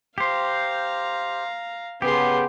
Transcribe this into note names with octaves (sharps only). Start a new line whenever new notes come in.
G4 C5 F5 A#5
C#3 B3 G4 G#4 C6